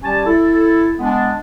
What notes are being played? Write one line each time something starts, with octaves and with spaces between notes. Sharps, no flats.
G3 C#4 G4 G#5 A5
E4 A4
G#3 B3 D4